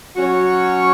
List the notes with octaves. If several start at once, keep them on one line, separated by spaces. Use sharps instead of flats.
F#3 C#4 F#4 C#5